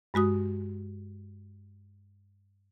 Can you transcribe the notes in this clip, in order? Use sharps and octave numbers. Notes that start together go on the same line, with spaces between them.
G2 G#3 F#4 D#6